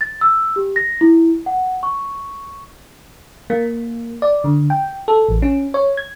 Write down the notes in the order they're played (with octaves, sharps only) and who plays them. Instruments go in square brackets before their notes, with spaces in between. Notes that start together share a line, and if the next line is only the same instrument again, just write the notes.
[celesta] A6
E6
G4
A#6
E4
F#5
C#6
[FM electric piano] A#3
D5
D3
G5
A4
A1
C#4
C#5
G#6